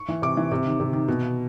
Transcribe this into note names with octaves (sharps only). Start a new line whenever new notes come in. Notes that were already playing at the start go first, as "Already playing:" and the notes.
Already playing: C#6
E3
C3 D6
E3
C3
D#3
C3
D#3
B2